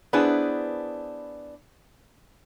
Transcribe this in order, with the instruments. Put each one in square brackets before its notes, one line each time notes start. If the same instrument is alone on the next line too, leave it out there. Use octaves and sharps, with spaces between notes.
[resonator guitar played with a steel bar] B3 D4 E4 G#4 B4 C5